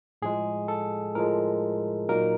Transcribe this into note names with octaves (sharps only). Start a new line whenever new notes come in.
A2 F3 G#3 G#4
A4
A2 F3 G#3 A#4
A#2 F#3 A#3 D#4 A#4